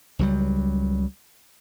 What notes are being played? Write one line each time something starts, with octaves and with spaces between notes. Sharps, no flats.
C#2 F#3 G3